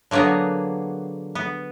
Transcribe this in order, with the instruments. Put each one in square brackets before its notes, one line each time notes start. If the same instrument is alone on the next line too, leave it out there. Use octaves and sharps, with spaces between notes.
[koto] D3 F#3 A#3 B3 G#4
B3